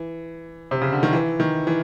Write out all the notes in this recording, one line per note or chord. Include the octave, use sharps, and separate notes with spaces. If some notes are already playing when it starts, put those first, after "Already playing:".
Already playing: E3
C3
C#3
D3
D#3
E3
D#3
E3